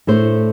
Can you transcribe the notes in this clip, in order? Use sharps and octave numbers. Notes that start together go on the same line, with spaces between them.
A2 A3 D4 C5